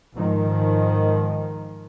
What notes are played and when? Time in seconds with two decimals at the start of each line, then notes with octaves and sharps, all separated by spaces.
0.15 G#2 D#3 F3